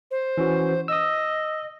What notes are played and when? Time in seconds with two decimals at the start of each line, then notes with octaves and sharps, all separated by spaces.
0.11 C5
0.37 E3 C#4 F#4
0.88 D#5 D#6 E6